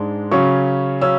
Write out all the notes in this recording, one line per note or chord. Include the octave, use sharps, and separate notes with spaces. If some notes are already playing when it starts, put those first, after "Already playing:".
Already playing: G#2 G#3 D4
C#3 F#3 C#4 C#6
C#3 F#3 C#4 E6